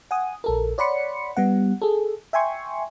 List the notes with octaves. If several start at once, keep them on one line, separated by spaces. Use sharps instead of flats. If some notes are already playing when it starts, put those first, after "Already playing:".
F#5 G#5 D#6
A#1 A4 A#4
C#5 D5 F#5 B5 C6 C#7
G3 B3 F#5
G#4 A4
E5 G5 G#5 C6 C#6